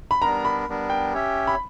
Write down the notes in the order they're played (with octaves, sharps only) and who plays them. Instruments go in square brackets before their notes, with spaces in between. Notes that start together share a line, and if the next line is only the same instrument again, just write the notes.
[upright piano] B5
[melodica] G3 B3 D4 A#4 [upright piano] A#5
[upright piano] B5
[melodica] G3 B3 D4 A#4
[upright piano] G5
[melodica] C#4 G4 C#5 E5
[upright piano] B5